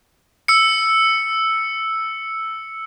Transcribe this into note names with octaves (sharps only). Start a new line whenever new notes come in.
E6 C#7